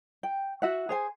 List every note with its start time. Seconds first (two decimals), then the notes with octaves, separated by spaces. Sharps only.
0.23 G5
0.62 F#4 E5 F#5
0.89 G#4 C5 G#5